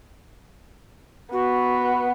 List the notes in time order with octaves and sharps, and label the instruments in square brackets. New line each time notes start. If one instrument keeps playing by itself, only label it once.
[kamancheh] B3 [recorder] F#4